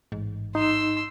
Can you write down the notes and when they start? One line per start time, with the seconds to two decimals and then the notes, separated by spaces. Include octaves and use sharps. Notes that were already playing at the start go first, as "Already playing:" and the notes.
0.12 A1 G#2
0.55 D#4 C6 E6